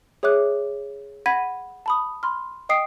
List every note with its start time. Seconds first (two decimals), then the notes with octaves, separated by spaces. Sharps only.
0.23 G#4 C#5 E5 D6 F#6
1.26 F#5 B5 G#6 A#6 B6 D#7
1.86 A5 B5 D#6
2.23 B5 C6 F6
2.69 D#5 G5 D#6 C7 D7